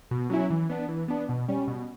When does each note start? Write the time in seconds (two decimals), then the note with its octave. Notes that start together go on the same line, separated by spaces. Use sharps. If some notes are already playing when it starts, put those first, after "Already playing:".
0.11 B2
0.30 F#3 C#4 E4
0.50 E3
0.70 B3 D4
0.89 E3
1.08 B3 D4
1.29 B2
1.48 G3 C#4
1.68 B2